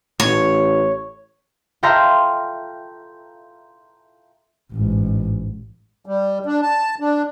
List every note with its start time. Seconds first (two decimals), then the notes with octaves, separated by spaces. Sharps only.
0.20 A1 C#5
1.83 F4 A4 E5 G5 A#5 C6
4.72 A1 G#2
6.06 G3
6.46 D4
6.62 A5
7.00 D4